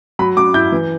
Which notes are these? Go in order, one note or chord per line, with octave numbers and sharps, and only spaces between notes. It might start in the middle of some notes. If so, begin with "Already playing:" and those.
F#3 B5
F#3 D6
E4 G6
E3